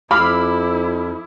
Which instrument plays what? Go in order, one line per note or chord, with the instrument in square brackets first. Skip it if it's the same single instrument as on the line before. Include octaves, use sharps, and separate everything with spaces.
[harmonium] F2 [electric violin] E4 [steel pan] F5 [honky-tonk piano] B5 D6 E6